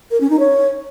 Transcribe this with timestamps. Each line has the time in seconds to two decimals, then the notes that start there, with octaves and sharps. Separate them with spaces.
0.11 A#4
0.20 C#4
0.30 D#4
0.39 C#5